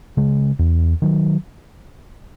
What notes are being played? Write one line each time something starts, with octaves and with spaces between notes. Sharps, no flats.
C#3 G#3
E2
D#3 F#3